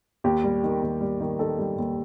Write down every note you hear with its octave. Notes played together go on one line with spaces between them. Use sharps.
D#2 G4
G3
D#3
D#2
G3
D#3
D#3 A4
G3
D#2